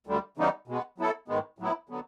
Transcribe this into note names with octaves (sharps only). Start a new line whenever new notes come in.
D2 D3 G3
C#3 E3 G3 B3 D#4
B2 G#3 B3
F#3 B3 E4 A4
G#2 D#3 G#3 B3
A2 F#3 B3 E4
D3 F#3 B3